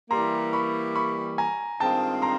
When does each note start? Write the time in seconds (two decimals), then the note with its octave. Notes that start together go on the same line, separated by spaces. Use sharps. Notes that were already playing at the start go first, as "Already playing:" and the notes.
0.10 E3 G3 A#3 A#5 C6
0.53 B5 C#6
0.95 B5 C#6
1.38 G#5 A#5
1.80 G2 D#3 G#3 C4 F4 G5 A5
2.22 A#5 C6